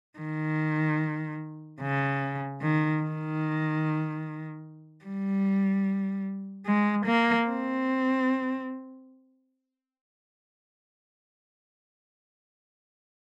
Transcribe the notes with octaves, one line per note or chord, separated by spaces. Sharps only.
D#3
C#3
D#3
D#3
G3
G#3
A#3
C4